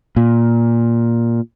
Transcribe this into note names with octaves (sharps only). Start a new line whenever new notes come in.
A#2